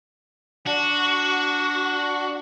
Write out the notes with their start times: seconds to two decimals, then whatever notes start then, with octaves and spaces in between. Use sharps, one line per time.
0.66 D4 F#4